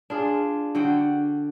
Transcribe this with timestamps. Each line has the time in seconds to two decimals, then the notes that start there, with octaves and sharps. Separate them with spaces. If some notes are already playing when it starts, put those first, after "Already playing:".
0.10 D4 F4 G#4
0.75 D3 F#4 F#5 G5